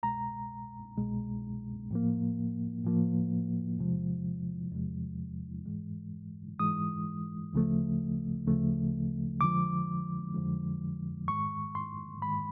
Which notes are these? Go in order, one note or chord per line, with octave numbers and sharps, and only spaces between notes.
C2 B2 G#3 A#5
C2 B2 G#3
A2 F3 A#3
A2 F3 A#3
E2 C3 F3 G#3
E2 C3 F3 G#3
G#2 E3 G#3
G#2 E3 G#3 D#6
D2 C#3 F3 A3
D2 C#3 F3 A3
F2 D3 F3 G#3 D6
F2 D3 F3 G#3
G#2 D#3 G#3 C#6
C6
G#2 D#3 G#3 B5